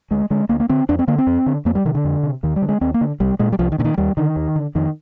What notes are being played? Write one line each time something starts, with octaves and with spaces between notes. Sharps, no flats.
D2 G#3
D3 G#3
D2 A#3
A#3
D3 C4
F2 D4
C4
D3 A#3
C4
F2
D3
F2 A#3
G3
C3 D#3
D3
F2
C3
D#2 D#3
G3
D3
G#3
D#2 C4
A#3
D3
C2 G3
A#2 G#3
G3
C2 F3
D#3
A#2 D3
D#3
D#2 G3
D3 D#3
D#2
D3
F2 D#3